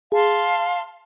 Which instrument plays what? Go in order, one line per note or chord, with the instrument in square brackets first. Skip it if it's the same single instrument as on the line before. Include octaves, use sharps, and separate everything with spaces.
[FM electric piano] G#4 [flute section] F5 A5 C6